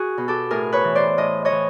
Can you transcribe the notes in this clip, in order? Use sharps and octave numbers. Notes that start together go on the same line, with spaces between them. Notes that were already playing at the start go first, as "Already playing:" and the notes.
Already playing: F#4 G#4
B2
G4 A4
A2 G#4 A#4
B4 C#5
E3
C5 D5
A2 D#5
C#5 D#5
E3